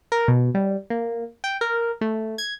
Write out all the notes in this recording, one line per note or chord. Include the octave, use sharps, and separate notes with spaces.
A#4
B2
G3
A#3
G5
A#4
A3
G#6